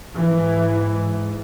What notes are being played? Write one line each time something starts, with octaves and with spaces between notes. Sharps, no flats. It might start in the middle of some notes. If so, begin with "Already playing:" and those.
G#2 E3